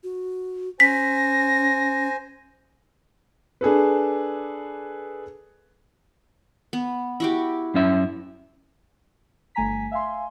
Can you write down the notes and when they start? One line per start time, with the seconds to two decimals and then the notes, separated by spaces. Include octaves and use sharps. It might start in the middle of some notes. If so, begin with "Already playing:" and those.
0.03 F#4
0.80 C#4 C5 G#5 A#6 B6
3.61 D4 G#4 A4 B4
6.73 B3
7.20 E4 F#4 G4
7.74 F#2 C#4 E5
9.55 G1 A3 G#5 A#5 B6
9.91 E5 F5 G#5 C6